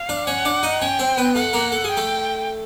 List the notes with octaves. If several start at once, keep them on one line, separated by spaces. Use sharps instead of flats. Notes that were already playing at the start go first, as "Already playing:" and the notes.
Already playing: F5
D4 D5
C#4 C#5 F#5
D4 D5
D#4 D#5
C#4 C#5 G5
C4 C5
B3 B4
A3 A4 F#5
A#3 A#4
A4
G#4
G5
A3 A4